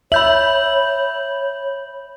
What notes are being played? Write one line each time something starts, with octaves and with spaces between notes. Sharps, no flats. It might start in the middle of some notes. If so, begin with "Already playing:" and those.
C#5 E5 B5 G6 F#7